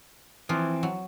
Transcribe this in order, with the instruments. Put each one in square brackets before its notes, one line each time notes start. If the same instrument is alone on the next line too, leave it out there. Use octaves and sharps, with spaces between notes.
[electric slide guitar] E3 C4 [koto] F3 F4
[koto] F#3